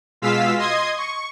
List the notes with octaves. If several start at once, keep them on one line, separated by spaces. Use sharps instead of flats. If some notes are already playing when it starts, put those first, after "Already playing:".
B2 G#3 F4 F5 E6 B6
D#5 C6 D#6 G#6
C#6